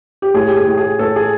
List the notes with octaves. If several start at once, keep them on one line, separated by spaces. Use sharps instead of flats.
G4
A2 G#4
G4
G#4
A2
G#4
A2 A4
G#4